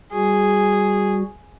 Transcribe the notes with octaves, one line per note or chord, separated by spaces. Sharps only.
G3 F#4 G#4